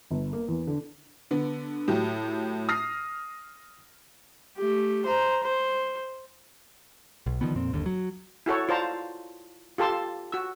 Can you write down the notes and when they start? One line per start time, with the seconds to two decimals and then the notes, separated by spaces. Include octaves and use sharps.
0.11 G1
0.33 A#3
0.48 E2
0.67 D3
1.31 D3 B3
1.88 A2 F#3 G4
2.69 D#6 F6 A#6 C7
4.58 A3 G4
5.06 C5 A#5
5.44 C5
7.26 B1
7.41 D3 D#3 F3 B3
7.55 F2 A#2 C4
7.72 G1 D#2 D3
7.86 F#3
8.46 E4 F#4 A4 C#5
8.69 F4 C5 D5 A5 A#5
9.78 F4 G4 A4 A5 C6
10.32 F#4 E6